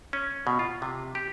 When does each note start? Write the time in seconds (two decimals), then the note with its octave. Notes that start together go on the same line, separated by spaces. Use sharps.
0.13 C#4
0.47 B2
0.59 F4
0.82 C3
1.15 G4